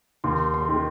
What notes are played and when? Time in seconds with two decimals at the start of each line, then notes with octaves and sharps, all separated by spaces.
0.24 D#2 C6
0.54 C6
0.69 D#3